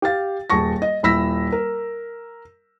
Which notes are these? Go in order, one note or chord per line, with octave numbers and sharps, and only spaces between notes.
G4 F5 A6
D#1 G#4 A5 C#6 A#6
D#5
D#1 E4 B5 E6 A#6 B6
A#4